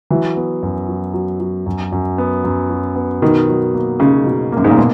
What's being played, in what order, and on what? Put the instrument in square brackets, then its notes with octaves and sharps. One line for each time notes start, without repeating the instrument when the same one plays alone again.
[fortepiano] E3 [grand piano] F#3
[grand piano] B3
F#2
F#3
F#3
F#3
F#2
F#2
B3
F#2
F#3
B3
[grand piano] B2 [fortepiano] D#3
[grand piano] F#3
A#3
[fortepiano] C#3 [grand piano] D#4
[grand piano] B2
[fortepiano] F#2 [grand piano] A#3
[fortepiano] G#2
A#2
[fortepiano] B2 [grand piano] A#3